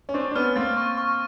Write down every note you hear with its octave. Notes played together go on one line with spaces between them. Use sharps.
C#4
C4 D4 C#6
D4
B3 C#4 F6
A#3 C4 A6
C#6
C#6